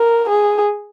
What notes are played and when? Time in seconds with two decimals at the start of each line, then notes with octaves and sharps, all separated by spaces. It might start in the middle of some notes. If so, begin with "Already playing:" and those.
Already playing: A#4
0.29 G#4